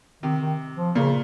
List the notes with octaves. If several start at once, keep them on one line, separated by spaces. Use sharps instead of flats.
C3 D#3
D#3
F3
A#2 C#3